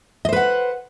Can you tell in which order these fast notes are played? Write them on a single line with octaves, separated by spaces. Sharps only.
D#5 C5 B4 F#5